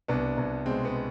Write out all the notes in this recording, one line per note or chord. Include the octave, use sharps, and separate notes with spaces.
C2 B3 D4
C2
B2 G#3 C4
B3